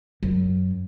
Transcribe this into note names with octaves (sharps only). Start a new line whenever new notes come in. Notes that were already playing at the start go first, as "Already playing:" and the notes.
F#2